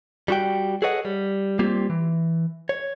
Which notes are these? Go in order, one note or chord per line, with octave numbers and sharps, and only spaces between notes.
G3 F#4 G5
G#4 A4 B4 C#5 D#5 F#5
G3
G3 A#3 C4 F4 G4
E3
C#5